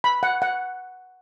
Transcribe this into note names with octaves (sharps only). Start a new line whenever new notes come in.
B5
F#5
F#5